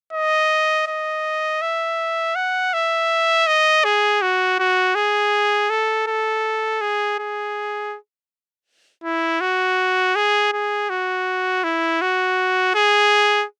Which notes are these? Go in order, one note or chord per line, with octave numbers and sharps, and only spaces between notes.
D#5
D#5
E5
F#5
E5
D#5
G#4
F#4
F#4
G#4
A4
A4
G#4
G#4
E4
F#4
G#4
G#4
F#4
E4
F#4
G#4